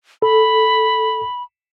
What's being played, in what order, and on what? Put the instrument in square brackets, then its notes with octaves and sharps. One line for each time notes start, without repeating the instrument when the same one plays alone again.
[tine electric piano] A4 [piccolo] B5